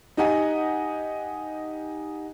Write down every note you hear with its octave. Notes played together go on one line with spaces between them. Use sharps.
D#4 G4 D#5 F#5 G#5